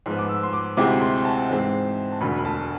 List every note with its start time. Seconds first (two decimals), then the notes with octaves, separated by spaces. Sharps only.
0.06 G#2 F3 B3
0.18 D6
0.29 E6
0.43 C6
0.53 D6
0.77 D2 C3 G#3 C4 E4 D6
1.01 C6
1.25 A5
1.49 G#2 E3 G#3 C4
2.12 A5
2.21 E1 D2 D3 B5
2.38 B5
2.45 A5